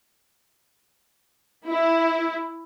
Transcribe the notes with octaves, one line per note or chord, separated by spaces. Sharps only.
E4